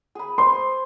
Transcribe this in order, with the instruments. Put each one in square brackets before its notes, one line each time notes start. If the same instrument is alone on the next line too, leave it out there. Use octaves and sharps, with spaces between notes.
[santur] G#4 B5
[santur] C5 [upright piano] C6